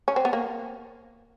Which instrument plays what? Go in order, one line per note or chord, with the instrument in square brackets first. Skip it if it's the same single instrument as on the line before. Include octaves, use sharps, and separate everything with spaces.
[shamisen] C#4
C4
B3
A#3